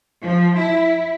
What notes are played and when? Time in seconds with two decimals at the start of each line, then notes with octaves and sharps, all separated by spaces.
0.22 F3
0.57 E4